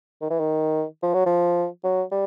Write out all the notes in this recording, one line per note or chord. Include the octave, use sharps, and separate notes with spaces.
D#3
E3
D#3
F3
F#3
F3
F#3
G3